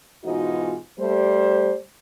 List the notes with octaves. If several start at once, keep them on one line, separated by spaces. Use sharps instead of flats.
G#2 B2 E3 D#4 F4 F#4
G3 A3 C5